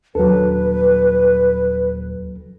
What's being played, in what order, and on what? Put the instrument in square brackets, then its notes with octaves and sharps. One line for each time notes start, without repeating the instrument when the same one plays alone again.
[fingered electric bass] D#1 D4 [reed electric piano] F#3 A4 [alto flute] B4